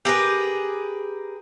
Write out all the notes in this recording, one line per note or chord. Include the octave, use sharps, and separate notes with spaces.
G4 G#4 A#4 B4